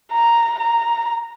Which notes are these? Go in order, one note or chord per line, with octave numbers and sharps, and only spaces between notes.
A#5
A#5